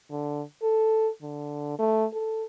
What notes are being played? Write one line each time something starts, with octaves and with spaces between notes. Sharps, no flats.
D3
A4
D3
A3
A4